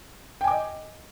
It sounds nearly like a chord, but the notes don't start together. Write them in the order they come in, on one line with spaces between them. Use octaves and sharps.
G5 G#5 D6 D#5